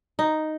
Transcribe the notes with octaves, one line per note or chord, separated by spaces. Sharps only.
D#4